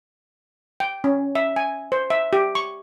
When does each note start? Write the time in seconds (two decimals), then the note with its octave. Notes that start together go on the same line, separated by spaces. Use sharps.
0.80 G5
1.04 C#4
1.35 E5
1.56 G#5
1.92 C5
2.10 E5
2.33 G4
2.55 C#6